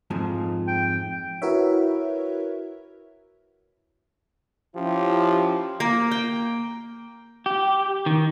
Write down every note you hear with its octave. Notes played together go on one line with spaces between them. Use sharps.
F2 G#2 F3
G5
E4 F#4 A#4 B4 C#5 E5
F3 C#4 E4 G4
A#3
G5
G4
D#3